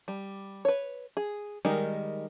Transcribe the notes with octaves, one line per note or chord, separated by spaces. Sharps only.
G3
B4 C#5
G#4
D#3 G3 G#3 D#4 A#4